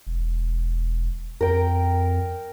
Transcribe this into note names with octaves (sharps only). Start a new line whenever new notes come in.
E1
F2 A#4 G5